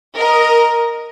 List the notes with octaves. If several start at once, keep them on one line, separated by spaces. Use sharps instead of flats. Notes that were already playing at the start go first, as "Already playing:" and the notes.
A#4 D#5